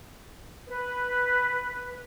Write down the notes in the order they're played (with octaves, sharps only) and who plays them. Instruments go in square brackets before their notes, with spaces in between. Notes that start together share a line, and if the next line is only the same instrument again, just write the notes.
[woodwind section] B4